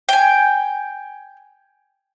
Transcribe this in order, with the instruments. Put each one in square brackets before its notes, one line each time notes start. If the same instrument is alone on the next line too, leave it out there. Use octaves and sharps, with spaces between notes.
[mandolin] G5 G#5